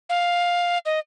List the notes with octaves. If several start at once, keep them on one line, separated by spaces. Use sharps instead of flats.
F5
D#5